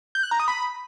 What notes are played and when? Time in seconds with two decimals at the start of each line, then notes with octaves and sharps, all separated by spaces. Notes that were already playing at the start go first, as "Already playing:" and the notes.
0.15 G6
0.23 F#6
0.31 A#5
0.40 D#6
0.48 B5